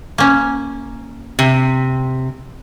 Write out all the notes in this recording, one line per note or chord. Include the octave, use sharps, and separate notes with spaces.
A#3 C#4
C3